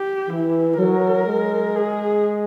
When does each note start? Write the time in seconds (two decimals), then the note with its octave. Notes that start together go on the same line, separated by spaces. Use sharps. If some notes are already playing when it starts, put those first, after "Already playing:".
Already playing: G4
0.29 E3 E4
0.78 F#3 A#4
1.26 G#3
1.75 G#4